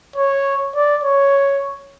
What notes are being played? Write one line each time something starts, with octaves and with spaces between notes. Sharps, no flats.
C#5
D5
C#5